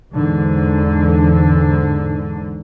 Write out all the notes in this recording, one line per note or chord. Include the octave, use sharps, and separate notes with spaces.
E2 G#2 D3